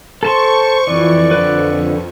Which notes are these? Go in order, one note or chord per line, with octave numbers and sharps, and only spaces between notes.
A4 C5 A5 C6 C#6
F2 E3 D5
D3 B4